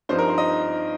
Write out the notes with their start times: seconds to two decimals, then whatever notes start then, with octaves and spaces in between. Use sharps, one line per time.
0.09 G2 F3 C4 D#4 C5
0.18 A#4
0.28 C5
0.38 D#5